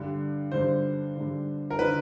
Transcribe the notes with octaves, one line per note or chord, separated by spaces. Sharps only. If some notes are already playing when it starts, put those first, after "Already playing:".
Already playing: G2 D3
G2 D3 C5
G2 D3
A#4
D3 B4